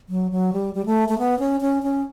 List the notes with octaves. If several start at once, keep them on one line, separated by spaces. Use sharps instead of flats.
F#3
F#3
G3
G3
A3
A3
B3
C#4
C#4
C#4